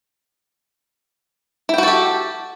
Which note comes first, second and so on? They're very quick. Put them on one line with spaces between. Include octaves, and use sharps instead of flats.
E4 G5 F#4 A4 G4